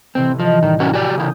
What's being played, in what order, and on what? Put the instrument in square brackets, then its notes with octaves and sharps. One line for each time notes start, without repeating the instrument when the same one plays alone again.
[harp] A1 C3 E3 [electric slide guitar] C4
[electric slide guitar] F3 [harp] D#5
[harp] A2 G3 [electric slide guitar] D#3
[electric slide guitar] E3 C#4 F#4
[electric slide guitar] F#4 G4 D5 [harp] G#5 D#7
[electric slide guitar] C#3 E3 [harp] D#6 G6